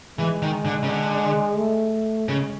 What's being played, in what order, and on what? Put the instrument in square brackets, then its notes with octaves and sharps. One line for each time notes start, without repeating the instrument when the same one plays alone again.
[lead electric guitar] E3 [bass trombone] G#3
[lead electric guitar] D#3
D3
C#3
D3
[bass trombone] A3
[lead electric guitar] C#3 [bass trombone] G#3